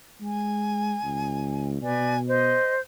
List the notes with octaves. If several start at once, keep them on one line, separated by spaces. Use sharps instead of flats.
G#3 G#5
C#2
B2 B4 D5 G#5
C5 D#5